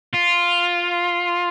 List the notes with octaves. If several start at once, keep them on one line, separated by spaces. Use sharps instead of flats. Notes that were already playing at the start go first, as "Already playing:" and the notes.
F4